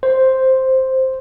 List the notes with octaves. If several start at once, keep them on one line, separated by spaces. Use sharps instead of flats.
C5